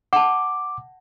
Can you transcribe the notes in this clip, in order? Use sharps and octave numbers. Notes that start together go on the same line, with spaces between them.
F#5 A5 D6